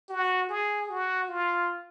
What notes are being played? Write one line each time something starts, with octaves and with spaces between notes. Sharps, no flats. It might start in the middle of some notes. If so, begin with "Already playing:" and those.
F#4
G#4
F#4
F4